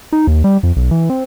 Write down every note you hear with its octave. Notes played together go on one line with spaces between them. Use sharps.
D#4
D#2
G3
F2
B1
E3
C4